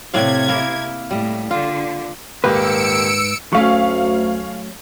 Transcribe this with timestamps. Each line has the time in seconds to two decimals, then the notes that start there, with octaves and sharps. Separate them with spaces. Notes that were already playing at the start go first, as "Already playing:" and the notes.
0.14 A2 C3 D5 F5 G#6
0.48 A#3 E4 A#4
1.11 A2 G3
1.51 D3 F4
2.44 D#1 G#2 A#3 G4 B4 E6 C#7 D7
3.53 D2 F#3 A3 C#4 F5 C#6